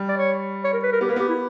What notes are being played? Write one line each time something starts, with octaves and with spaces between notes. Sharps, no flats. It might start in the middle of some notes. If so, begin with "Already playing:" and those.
Already playing: G3
D5
C#5
C#5
A#4
B4
A#4
B3 G4
A#3 B4
B3 G4
E4